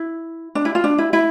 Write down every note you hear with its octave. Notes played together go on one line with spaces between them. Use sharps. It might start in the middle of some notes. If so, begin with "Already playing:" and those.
Already playing: E4
D4
E4
F4
D4
E4
E4